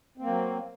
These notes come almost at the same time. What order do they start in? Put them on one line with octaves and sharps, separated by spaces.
C4 A#3 F#3